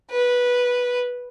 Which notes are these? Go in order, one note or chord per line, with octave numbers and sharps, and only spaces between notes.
B4